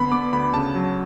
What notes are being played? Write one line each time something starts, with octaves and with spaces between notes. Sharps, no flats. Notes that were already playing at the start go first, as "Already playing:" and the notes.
Already playing: D3 B3 B5
B3 D6
D2 B5
C#3 A5
F#3